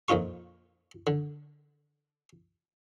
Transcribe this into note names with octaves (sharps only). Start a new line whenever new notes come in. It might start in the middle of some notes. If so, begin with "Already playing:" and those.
F2 A#2 D#4 F4 C#6
D3